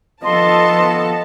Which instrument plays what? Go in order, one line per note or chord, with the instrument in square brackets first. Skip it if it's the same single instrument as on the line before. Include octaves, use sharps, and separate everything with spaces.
[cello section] F3 A4 [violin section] B3 A5 [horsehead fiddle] F4 D#5 [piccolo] C6